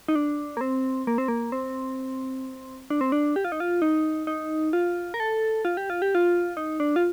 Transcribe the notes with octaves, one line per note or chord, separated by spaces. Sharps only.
D#4
D4
A#3
C4
A#3
C4
A#3
C4
D4
C4
D4
G4
F4
D#4
F4
D#4
D#4
F4
A#4
A4
F4
G4
F4
G4
F4
D#4
D4
F4